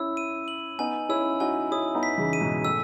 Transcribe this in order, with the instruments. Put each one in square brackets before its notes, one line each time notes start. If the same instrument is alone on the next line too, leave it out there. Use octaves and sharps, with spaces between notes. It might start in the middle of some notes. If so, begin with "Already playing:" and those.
Already playing: [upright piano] C#4 E4 [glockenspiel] E6
[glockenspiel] D#7
F#7
[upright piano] B3 D#4 [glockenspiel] G#5
[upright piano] C#4 E4 [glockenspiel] E6
[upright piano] D#4 F#4 [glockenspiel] G#5
[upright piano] C#4 E4 [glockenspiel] D#6
[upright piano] B3 D#4
[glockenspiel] B6
[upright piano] C#3 E3
[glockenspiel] D#7
[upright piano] G#2 B2
[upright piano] A2 [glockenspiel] E6